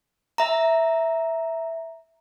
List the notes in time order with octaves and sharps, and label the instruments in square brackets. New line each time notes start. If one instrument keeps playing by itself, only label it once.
[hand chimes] E5 A#5